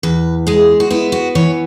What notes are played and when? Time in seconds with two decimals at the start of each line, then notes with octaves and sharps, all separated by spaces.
0.03 E2 B4
0.47 G#3 G#4
0.80 F#4
0.91 B3 E4
1.12 F#4
1.35 E3 C#5